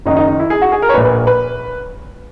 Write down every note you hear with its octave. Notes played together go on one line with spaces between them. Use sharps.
F#1 F#2 D#3 D#4
D#4
D#4
E4
G#4
F#4
G#4
A#4
C#5
A#1 A#2 B4
B4
B4